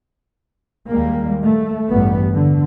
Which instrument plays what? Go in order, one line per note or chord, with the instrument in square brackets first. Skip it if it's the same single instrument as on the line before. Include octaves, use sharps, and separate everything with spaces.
[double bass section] D#2 G3 G#3 A#3
A3
A1 E2 G2 G3 B3
D3